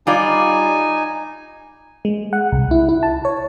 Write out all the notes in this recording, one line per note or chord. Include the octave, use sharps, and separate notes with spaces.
G3 D#4 F4 D5 G#5
G#3
F#5
C2
E4
E4
A5
C#5